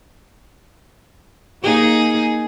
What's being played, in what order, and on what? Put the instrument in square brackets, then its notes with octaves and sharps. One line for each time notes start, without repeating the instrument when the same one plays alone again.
[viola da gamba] A#3 D#4 G#4